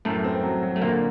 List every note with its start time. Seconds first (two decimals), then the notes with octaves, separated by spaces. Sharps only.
0.05 F#2 A2 A3
0.24 C4
0.43 F#3
0.63 F#3
0.76 A3
0.81 A#2 D3 A#3